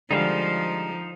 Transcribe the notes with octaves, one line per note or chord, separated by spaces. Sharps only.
D3 F3 G3 G#3 D#4 C5 F5